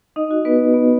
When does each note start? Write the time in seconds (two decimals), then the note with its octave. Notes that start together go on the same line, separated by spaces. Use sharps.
0.16 D#4 D#5
0.31 F#4
0.45 B3 B4
0.74 B3